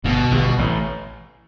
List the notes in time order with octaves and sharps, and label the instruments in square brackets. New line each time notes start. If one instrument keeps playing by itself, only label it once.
[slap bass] G1 G2 [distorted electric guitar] B2
[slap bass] G1 G2
A1 A2